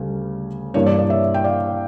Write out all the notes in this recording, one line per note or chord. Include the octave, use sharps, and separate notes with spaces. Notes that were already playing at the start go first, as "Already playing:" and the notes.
Already playing: D2 C#3 G3 C#4
G2 E3 A#3 D4 C#5
D5
D5
C#5 E5
G5
D5 F5